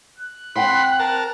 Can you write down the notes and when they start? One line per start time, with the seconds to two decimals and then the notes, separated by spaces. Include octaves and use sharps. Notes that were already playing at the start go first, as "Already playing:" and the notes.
0.18 F#6
0.56 C4 F#5 G5 B5 C6
1.00 A#4 A5